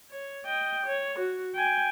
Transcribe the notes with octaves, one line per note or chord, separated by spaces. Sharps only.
C#5
D#5 G5
C#5
F#4
G5 G#5